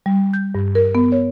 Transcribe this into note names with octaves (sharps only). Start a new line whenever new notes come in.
G3
G6
G2
A#4
B3
C#5